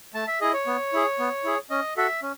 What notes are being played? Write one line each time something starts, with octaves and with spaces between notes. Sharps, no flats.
A3 A5
E5
E4 G#4 D#5
C#5
B3
E4 G#4
B3
E4 G#4
C#4 D#5
F#4 A4 E5
C#4